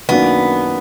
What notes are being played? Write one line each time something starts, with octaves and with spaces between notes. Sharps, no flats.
F#2 D#3 A#3 B3 D4 F#4